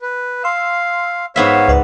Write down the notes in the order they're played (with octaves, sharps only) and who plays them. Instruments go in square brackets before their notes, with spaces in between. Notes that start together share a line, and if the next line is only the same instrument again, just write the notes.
[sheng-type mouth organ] B4
[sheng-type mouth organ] F5 [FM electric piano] C6 E6
[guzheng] G#2 B3 E5 [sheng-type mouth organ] C#5 F5 [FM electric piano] B6
[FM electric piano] C#2 B4 D5